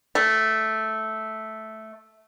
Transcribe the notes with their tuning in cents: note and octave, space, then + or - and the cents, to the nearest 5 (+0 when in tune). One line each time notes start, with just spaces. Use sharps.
A3 -5